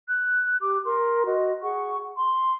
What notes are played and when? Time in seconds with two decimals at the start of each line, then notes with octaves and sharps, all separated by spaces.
0.08 F#6
0.61 G4 D6
0.86 A#4 C6
1.25 F#4 D#5
1.63 G#4 F#5 C#6
2.17 C6